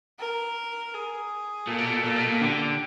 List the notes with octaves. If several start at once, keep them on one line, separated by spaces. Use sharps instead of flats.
A#4
G#4
A#2 A4
B2
A#2
A#2
B2
A#2
D3 G4